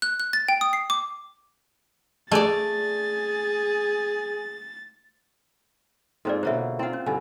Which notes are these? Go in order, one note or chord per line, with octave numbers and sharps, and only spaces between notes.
F#6
F#6
A6
G5
D#6
C7
D6
A3 G#4 D5 A6
G#2 C4 F4 A4 C5 D5
B2 D3 A#3 C5 C#5 E5
C4 E4 F4 F#5
C#4
G2 D3 G#5